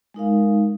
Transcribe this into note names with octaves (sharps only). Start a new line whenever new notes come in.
G#3 D#4 A#4 F5